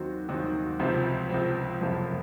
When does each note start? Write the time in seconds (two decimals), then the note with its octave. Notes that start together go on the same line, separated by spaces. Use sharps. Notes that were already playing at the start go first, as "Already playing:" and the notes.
Already playing: D#2 D#3 F#3 C4 F#4
0.29 D#2 D#3 F#3 C4 F#4
0.79 C#2 C3 F3 C4
1.29 C#2 C3 F3 C4
1.80 F#1 F2 C3 F3 A#3